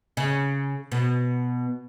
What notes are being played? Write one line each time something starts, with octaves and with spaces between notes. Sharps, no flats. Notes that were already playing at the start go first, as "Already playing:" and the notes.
C#3
B2